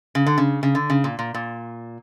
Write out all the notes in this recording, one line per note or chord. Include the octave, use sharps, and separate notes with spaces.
C#3
D3
C#3
C#3
D3
C#3
A#2
A#2
A#2